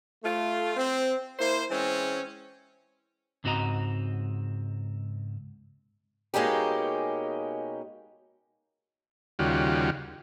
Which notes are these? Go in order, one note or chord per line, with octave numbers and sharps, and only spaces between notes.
A3 F4
C4
A#3 E4 C5
E3 G#3 C4 C#4
C#2 G#2 C4 F#4 D#5 A#5
B2 G#3 A#3 C#4 D#4 G4
D#2 C#3 G3 F4 F#4